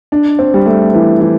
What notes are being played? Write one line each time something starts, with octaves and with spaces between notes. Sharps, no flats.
D4
C4
G3
A3
E3
E3